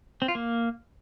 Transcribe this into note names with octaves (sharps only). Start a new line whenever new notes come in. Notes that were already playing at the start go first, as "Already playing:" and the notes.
C4
F4
A#3